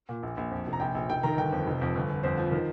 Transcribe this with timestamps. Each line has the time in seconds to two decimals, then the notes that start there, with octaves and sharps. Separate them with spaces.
0.09 A#2
0.23 A#1
0.37 A#1
0.51 F2
0.66 F1
0.73 A#5
0.80 A#1 G5
0.95 A#1
1.09 F1 G5
1.23 D#3 A#5
1.37 G1 G5
1.52 F2
1.67 F1
1.81 F2
1.95 G1
2.09 G1
2.23 F2 C5
2.38 F3
2.52 D#3